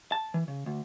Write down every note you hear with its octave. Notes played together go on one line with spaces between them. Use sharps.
A5
E3
C#3
D2